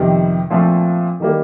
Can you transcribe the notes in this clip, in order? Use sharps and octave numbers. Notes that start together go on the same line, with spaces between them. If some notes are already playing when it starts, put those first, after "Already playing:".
Already playing: F2 C3 D#3 G3 B3
A#2 F3 A3 C4
D#3 G3 A#3